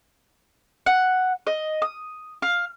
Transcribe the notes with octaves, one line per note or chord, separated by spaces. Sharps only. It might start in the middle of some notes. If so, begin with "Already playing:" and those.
F#5
D#5
D#6
F5